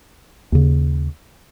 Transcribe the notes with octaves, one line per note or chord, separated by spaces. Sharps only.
D#2 C#3